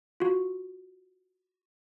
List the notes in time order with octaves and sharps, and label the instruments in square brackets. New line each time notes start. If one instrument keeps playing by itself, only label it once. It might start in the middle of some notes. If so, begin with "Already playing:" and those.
[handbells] F4 F#4